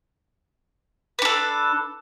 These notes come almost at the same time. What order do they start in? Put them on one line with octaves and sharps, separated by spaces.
B4 D4 A4